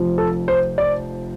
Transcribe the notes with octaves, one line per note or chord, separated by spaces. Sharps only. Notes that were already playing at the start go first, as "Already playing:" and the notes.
Already playing: F1 F2 F3
A4
C5
D5